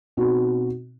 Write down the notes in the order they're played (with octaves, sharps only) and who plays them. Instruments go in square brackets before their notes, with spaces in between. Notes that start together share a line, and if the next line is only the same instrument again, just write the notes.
[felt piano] B2 C4 D#4 F#4